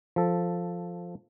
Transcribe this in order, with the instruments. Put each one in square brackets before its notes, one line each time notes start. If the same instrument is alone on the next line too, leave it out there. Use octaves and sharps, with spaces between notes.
[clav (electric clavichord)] F3 A4